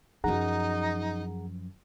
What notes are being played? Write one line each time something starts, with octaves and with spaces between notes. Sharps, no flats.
F#2 F3 D#4 G#4 F#5 A#5